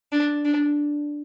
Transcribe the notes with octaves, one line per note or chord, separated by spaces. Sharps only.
D4
D4